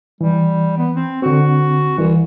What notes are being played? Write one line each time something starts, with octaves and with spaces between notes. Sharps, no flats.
E3 G3
B3
C4
D3 C4 F#4
C2 E3